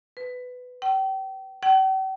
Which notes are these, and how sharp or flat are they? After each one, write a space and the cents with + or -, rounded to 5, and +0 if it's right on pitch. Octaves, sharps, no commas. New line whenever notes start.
B4 +15
G5 -35
G5 -45